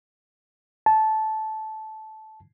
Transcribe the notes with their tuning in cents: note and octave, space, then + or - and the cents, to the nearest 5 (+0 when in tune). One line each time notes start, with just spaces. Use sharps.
A5 -15